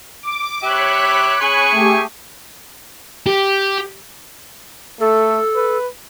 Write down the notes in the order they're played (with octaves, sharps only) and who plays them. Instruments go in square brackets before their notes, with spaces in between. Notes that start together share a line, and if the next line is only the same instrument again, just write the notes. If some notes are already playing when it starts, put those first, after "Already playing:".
[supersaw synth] D6
[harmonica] G4 E5 [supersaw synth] C#5 B5 F#6 [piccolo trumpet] D6
[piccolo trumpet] G#4 [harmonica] G#5 C#6
[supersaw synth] A3 G4
[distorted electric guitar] G4
[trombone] A3 [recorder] A4
[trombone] B4